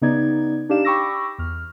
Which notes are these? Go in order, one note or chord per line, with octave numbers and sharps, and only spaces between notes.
C#3 B3 D#4 D5 G#6
D4 D#4 G4 D5 F5 E7
G5 B5 C#6 D6 E6 A#6
E2 F6